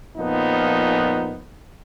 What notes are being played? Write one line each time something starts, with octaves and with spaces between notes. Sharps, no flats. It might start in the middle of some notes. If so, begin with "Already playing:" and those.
F2 A#2 F3 B3 D#4